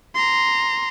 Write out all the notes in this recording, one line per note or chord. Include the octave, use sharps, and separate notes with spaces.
A#5 C6